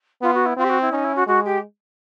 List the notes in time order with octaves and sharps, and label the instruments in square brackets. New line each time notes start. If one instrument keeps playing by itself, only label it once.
[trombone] B3 [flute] F4
[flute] F#4
E4
[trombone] C4 [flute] F4
[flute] G4
F#4
E4
[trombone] C#4 [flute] D#4
[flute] E4
F#4
[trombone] G#3 [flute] F#4
[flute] G4